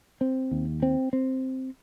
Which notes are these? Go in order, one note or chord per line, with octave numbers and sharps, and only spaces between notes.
C4
D#2
C4
C4